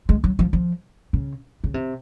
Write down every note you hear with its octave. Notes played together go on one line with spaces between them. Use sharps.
G#3
F#3
F3
F3
C#3
C#3
C3